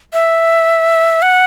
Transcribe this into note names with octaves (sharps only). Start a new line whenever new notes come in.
E5
F#5